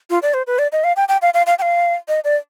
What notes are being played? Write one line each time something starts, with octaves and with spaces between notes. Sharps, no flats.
F4
D5
C5
B4
D5
D#5
F5
G5
G5
F5
F5
F5
G5
F5
D#5
D5